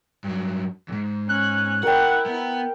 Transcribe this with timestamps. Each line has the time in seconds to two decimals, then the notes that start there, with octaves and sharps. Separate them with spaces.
0.24 G2 F#3
0.88 E2 G#2
1.29 C#4 F#6
1.83 E4 A#4 F#5 G5
2.26 B3